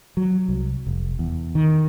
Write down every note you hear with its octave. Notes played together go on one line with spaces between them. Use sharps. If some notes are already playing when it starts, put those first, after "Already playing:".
F#3
C2
F1
E2
D#3